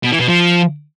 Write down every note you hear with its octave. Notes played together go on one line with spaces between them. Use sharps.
B2
E3
B2
F3